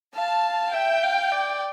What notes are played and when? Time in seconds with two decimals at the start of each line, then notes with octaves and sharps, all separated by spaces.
0.15 F5 A5
0.73 E5 G5
1.03 F5
1.32 D5